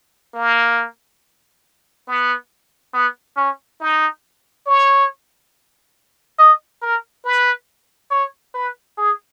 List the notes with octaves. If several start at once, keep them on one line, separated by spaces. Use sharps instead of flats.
A#3
B3
B3
C#4
D#4
C#5
D#5
A#4
B4
C#5
B4
G#4